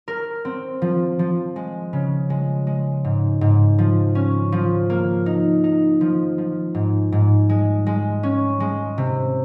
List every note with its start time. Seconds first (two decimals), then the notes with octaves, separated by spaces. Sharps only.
0.08 A#4
0.45 C4
0.82 F3
1.19 F3
1.56 G#3
1.93 C#3
2.30 G#3
2.67 G#3
3.05 G#2
3.41 G#2
3.78 F3
4.15 C#4
4.52 F3
4.90 A#3
5.26 D#4
5.64 D#4
6.01 F3
6.38 F3
6.75 G#2
7.12 G#2
7.49 G#3
7.86 G#3
8.23 C#4
8.60 G#3
8.98 C3